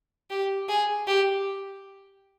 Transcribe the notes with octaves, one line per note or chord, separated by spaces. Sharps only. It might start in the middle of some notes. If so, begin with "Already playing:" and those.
G4
G#4
G4